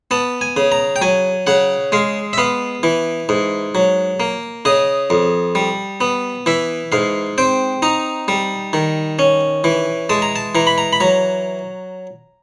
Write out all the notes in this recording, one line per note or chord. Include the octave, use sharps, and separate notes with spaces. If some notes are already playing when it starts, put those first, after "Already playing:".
B3 A5
G#5
C#3
A#5
G5
F#3 G#5
C#3 F#5
G#3 F5
E5
B3 F5
E3
G#2
F#3
A#3
C#3 D#5
F2
G3
B3
E3 E5
G#2 F5
C4 G5
D#4 A#5
G3
D#3
C#4
E3
G#3 A5
A#5
A5
E3 A#5
B5
A#5
B5
F#3 A#5